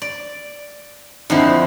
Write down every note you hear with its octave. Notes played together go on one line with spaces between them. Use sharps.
D5
F2 D3 F3 D#4 E4